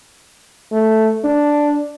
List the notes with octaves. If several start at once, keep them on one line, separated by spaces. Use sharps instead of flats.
A3
D4